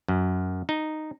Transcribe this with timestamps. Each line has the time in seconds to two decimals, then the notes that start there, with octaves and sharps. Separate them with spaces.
0.08 F#2
0.69 D#4